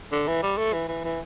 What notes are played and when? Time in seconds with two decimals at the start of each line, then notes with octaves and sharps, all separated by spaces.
0.12 D3
0.27 E3
0.43 G3
0.58 A3
0.73 E3
0.88 E3
1.04 E3